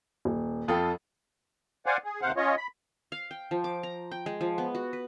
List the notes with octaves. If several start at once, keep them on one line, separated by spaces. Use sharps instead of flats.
D#1
F2 F4 A4 G5 D#6
C5 D5 F5 F#5 G#5
G#4
D#2 C3 C5 F5 F#5
C#4 F4 C#5 D#5
B5
F5
G5
F3
D6
A#5
G5
G#3
F3
B3
F#4
B4